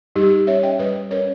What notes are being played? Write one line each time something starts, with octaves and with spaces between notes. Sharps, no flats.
G3 D#4 G4
C#4 C#5 E5
D#5 G5
G3 B4 D#5
C#4 A#4 C#5